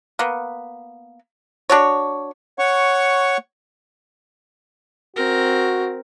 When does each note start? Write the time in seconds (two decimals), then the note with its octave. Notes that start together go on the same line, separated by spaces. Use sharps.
0.19 A#3 B3
1.70 D4 F#4 C#5
2.59 C#5 F#5 C#6
5.17 C4 F#4 A#4